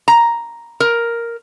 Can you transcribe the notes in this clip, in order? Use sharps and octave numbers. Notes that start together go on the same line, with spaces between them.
A#5
A#4